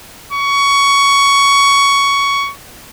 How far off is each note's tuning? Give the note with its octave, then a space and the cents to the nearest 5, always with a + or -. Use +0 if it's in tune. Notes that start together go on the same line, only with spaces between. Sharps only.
C#6 +15